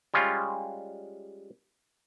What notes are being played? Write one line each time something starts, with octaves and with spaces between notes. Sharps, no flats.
G3 G#3 C#4 F4